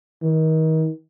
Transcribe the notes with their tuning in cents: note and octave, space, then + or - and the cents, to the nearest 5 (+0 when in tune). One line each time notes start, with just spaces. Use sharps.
D#3 +35